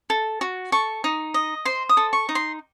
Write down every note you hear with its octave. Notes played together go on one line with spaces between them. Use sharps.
A4
F#4
A4 C#6
D#4
D#5
C5 C6
D#6
A4
C#6
D#4
C6